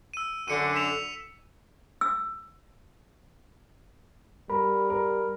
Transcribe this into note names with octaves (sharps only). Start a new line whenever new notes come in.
E6 D#7
F#2 D3 C#7 D#7
B6 E7 F7
E6
G3 A#4 B5
A#4